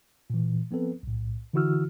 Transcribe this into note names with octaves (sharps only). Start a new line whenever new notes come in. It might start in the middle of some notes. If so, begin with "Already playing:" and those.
A#2 E3
F3 B3 C4 A4 B4
B1 A2
D3 E3 E4 F#4 E6 F6